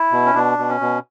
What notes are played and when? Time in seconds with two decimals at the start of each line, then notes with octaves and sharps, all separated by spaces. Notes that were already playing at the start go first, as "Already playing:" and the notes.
Already playing: E4
0.12 B2
0.26 C#4
0.35 B2 D4
0.58 B2
0.69 C#4
0.81 B2